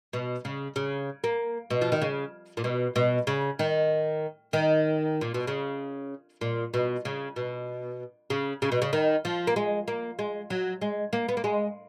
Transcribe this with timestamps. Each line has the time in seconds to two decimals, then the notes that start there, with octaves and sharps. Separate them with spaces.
0.13 B2
0.45 C#3
0.76 C#3
1.24 A#3
1.70 B2
1.81 F3
1.92 D#3
2.02 C#3
2.57 A#2
2.64 B2
2.96 B2
3.27 C#3
3.59 D#3
4.53 D#3
5.21 A#2
5.34 B2
5.47 C#3
6.41 A#2
6.74 B2
7.05 C#3
7.36 B2
8.30 C#3
8.62 C#3
8.72 B2
8.82 C#3
8.93 D#3
9.25 F3
9.47 A#3
9.56 G#3
9.88 A#3
10.19 G#3
10.50 F#3
10.81 G#3
11.13 A#3
11.28 B3
11.37 A#3
11.44 G#3